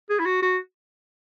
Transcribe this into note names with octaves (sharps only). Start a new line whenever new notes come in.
G#4
E4
F#4
F#4